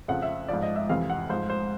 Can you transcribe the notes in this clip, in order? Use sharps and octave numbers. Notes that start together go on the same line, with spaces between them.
F2 C#3 F3 F#5
E5
G#2 F3 D5
D#5
E5
F2 C3 E3 F5
F#5
G#2 F3 C5
C5